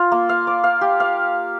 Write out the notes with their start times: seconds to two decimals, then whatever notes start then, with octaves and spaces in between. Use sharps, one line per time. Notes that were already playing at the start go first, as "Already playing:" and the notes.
Already playing: F4
0.12 A#3
0.29 F5
0.47 D5
0.64 F5
0.81 G4
1.00 F5